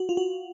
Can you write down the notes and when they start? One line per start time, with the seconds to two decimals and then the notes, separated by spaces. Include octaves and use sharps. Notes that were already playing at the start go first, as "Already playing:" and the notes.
Already playing: F#4
0.09 F4
0.17 F#4